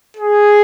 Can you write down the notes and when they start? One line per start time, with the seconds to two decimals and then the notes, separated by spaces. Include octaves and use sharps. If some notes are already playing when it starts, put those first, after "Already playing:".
0.17 G#4